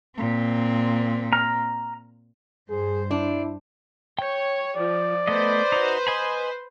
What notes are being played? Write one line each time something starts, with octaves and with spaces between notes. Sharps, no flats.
A#2 C4
A#5 F6
G2 G#4 C5
D4 E4
C#5 G5 G6
F3 D5
A3 B3 B4 C5 D#5
D#4 F#4
D#5 G#5 B5